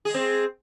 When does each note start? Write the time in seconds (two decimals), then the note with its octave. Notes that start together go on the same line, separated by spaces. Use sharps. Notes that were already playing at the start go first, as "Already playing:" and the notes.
0.05 G#4
0.10 G#3
0.14 C4